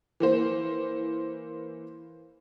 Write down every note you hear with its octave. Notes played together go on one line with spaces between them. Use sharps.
E3 A#3 C5